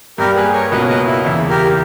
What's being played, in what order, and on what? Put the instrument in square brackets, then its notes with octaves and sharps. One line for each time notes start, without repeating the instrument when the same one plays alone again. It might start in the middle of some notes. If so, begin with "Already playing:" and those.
[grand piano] G2 G3 A#3 [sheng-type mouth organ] G4 A#4
[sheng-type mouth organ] G#4 B4
A#4 C#5
[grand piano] C#2 B2 A#3 C#4 [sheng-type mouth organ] B4 D#5
[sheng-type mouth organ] B4 D#5
E4
[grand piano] E2 C#3 E3 [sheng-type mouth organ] E4
[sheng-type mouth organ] G4 A#4